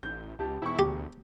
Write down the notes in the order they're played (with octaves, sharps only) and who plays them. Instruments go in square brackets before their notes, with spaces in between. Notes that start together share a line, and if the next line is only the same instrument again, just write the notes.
[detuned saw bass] A1 [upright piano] G6
[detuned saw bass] C#2 [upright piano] G4 A5
[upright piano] E1 C#6 [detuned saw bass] E4
[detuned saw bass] D2 [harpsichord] G4